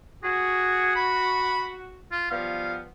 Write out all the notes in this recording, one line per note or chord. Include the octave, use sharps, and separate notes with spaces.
F#4 G#4
B5
F4
F3 G3 B3 F5